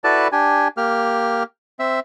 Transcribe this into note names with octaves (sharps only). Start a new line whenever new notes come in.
E4 F#4 A4 B4 D5 A5
D4 G4 G#5
A#3 G4 F6
C4 E5